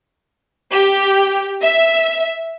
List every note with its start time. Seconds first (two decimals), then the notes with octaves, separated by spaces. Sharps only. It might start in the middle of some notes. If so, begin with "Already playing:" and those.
0.71 G4
1.62 E5